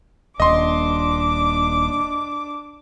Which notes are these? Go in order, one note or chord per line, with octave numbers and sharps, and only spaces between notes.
D#1 D4 D#5 C6 D6